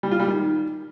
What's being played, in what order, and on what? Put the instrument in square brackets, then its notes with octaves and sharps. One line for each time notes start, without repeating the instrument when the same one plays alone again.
[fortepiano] G3
F4
G3
D#3